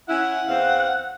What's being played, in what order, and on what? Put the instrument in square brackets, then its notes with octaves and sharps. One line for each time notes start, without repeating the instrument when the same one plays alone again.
[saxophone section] C#4 E4 [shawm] F#5
[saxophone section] E2 C4 F5